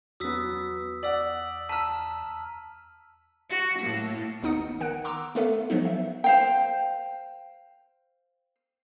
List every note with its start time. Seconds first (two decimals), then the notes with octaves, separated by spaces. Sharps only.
0.20 E2 F#3 B3 D#6 E6 B6
1.03 D5 F#5 E6 B6 F#7
1.69 A5 A#5 E6 F6 B6
3.50 F#4
3.79 A2 A#3
4.42 G#1 D#2 B3 D#4 D#6 C#7
4.81 D#3 F#5 F#6 D7
5.04 A#5 C6 D6 E6
5.35 A3 B3 A4 E5
5.70 F3 F#3 B3 D#4
5.85 E5
6.24 C5 F5 G5